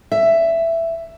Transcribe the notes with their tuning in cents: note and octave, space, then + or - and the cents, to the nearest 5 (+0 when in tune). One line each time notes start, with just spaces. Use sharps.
E5 +10